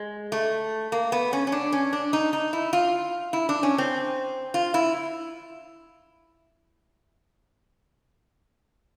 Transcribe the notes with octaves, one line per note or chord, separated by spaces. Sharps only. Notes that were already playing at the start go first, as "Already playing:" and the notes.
Already playing: G#3
A3
A#3
B3
C#4
C#4
D4
C#4
D4
D#4
D#4
E4
F4
E4
D4
C#4
C4
F4
E4